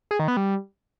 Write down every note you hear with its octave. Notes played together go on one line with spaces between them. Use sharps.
G#4
D#3
B3
G3